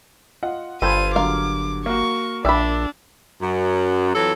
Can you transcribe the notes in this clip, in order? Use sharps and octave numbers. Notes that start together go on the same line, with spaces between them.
F4 D#5 F#5
G1 F4 A4 C5 G5 B5 G#6 D#7
D3 F#3 A#4 F5 D6
A#3 F#4 C#6
A#1 D4 D5 E5 G5 B5 E6
F#2
F2 E3 F#3 A4